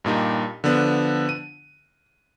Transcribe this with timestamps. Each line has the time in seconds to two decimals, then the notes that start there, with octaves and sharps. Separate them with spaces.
0.04 G2 A#2 D#4 G4
0.64 D3 F3 B3 D4
1.29 D#7